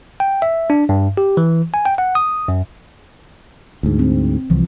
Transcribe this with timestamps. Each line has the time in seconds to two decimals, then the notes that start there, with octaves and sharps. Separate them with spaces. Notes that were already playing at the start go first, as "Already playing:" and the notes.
0.20 G5
0.42 E5
0.70 D4
0.89 G2
1.17 G4
1.37 E3
1.74 G#5
1.85 G5
1.98 F#5
2.15 D#6
2.48 F#2
3.83 D2 G#2
3.99 C4
4.50 C2 E3 F3